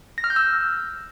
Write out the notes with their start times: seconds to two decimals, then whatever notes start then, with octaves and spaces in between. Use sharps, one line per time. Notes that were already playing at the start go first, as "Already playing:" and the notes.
0.18 A#6
0.24 F6
0.30 G6
0.36 E6